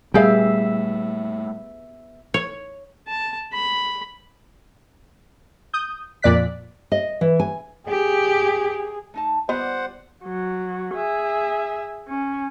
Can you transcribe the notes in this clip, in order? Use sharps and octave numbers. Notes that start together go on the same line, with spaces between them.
A#2 G3 A3 B3 G4 G#4 E5 F5
C#5
A5
B5
D#6 G6
F2 A#2 D5 F#6 B6
D#5
E3
G#5
G4 G#4
A3 D#4 A5
G3 B3 F4 C5 D#5 F#5
F#3
G#4 E5
C#4